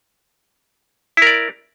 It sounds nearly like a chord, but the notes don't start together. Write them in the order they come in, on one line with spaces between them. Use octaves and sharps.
E4 A#4 D5